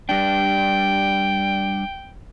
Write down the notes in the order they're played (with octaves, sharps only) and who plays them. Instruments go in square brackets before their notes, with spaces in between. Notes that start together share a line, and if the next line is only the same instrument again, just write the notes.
[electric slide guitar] G3 D4 [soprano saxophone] G5